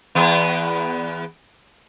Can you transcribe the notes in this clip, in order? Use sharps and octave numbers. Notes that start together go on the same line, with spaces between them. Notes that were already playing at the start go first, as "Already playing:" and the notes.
E2 B3